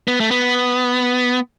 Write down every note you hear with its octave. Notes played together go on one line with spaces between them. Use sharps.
B3
A3
B3